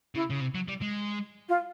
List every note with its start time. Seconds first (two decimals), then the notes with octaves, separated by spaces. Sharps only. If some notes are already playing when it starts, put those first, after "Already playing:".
0.15 C#3 E4
0.31 C#3
0.41 C3
0.55 F#3
0.68 G3
0.81 G#3
1.48 F4